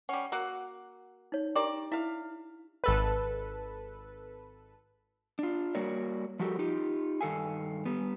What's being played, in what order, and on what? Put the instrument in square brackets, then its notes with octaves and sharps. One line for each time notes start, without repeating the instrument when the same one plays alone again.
[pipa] G3 C#4 [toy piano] F#5
[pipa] A#3 F#4 F#5 [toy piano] A#4
[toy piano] D#4 C#5
[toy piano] D4 G4 [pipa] A#4 D5
[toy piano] E4 [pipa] E5 F5
[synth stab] G#1 A4 B4
[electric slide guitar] D4 F4
G3 A#3 F#4 A#4 C#5 D5
F3 G3 F#4 G4 A4 A#4
D#4 F4 G4
G2 D#3 A4 F5 G#5
G3 B3